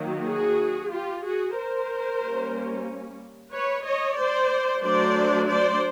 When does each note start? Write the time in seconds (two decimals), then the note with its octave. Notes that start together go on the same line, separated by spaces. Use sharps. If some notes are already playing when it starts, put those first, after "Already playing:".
Already playing: D#3 F#3 A#3
0.26 F#4 G#4
0.91 F4 G4
1.24 F#4 G#4
1.56 A#4 C5
2.21 G3 A#3 C#4
3.52 B4 C#5
3.84 C#5 D#5
4.17 C5 D5
4.83 F#3 A3 D4 C5 D5
5.48 C5 D5